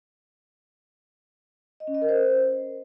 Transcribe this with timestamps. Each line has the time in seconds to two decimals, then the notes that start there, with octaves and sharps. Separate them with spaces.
1.80 D#5
1.87 C#4
1.94 D#5
2.02 A#4
2.09 C5